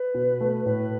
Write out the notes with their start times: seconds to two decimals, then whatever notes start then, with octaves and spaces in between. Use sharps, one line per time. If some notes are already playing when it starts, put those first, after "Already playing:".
Already playing: B4
0.14 B2
0.41 A3
0.66 A2 B4